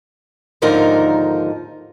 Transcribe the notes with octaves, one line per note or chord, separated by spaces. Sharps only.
D#2 G#2 D3 F3 D#4 A#4